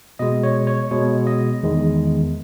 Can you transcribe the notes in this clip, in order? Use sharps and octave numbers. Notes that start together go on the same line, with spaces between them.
B2 G#3 D#5
C#5
C#5
B2 G#3 C#5
D#5
E2 D#3 G#3